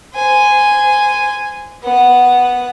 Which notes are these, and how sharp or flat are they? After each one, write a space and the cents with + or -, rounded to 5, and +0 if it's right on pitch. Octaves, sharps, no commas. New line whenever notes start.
C5 -25 G#5 -5
B3 +0 F#5 +0